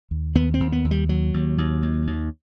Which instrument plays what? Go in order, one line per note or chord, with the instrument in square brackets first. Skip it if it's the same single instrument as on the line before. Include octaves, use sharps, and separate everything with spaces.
[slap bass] D#2
D#2 B3
C4
D#2
B3
D#2
G3
D#2 F#3
D#2
D#2
D#2
D#2